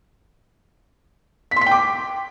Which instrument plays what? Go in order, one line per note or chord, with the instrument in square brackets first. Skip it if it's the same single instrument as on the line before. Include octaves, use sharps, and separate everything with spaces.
[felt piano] B6
C6
B6
G5
D6